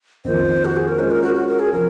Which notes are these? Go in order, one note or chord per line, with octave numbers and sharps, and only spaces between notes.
F2 D#3 A#3 F4 C5
F#4
G#4
A#4
G#3 C#4 F4 C5
A#4
F#4
F#4
A#4
G#4
C3 F3 C4 A#4